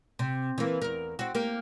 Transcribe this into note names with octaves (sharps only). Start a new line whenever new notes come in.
C3
E3 A#3
E2 A#4
C4 F#4
A#3 G4 A#4